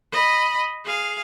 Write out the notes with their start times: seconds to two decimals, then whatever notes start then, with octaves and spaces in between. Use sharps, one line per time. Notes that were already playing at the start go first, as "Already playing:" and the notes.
0.12 D#5 B5
0.85 G#4 F5